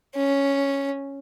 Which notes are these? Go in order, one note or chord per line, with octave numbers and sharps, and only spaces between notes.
C#4